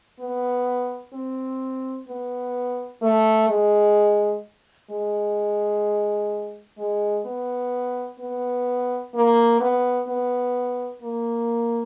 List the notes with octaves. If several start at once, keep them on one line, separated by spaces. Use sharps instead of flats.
B3
C4
B3
A3
G#3
G#3
G#3
B3
B3
A#3
B3
B3
A#3